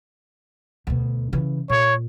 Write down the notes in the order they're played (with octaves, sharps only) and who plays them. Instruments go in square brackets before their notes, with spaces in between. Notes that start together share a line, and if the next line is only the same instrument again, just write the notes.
[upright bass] D2 B2
C#3 E3
[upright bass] A#2 [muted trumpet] C#5